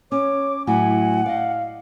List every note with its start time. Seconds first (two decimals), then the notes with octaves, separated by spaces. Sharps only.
0.12 C#4 C#5 D6
0.67 A2 F#3 E4 F#5 G#5
1.26 D5 D#5 F5